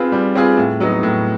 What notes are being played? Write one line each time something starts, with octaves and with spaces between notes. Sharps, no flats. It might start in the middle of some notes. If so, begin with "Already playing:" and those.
Already playing: C4 F4 G#4 B4
G3
C4 F4 G#4 B4
A2
F#3 B3 D#4
A2